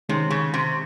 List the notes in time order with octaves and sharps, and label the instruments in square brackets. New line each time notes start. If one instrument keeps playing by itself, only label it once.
[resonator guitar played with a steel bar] C3 [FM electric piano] D#3 G#3 C#4 G#4
[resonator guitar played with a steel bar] C#3
C3